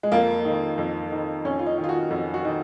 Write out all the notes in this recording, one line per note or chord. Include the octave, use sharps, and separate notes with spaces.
G#3
F2 A#3
D#3
F2
D#3
F2 C#4
F4
D#4
D#3
F4
F#4
F2
F#4
D#3